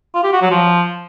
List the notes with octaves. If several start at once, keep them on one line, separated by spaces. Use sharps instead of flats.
F4
G4
F#4
F#3
F3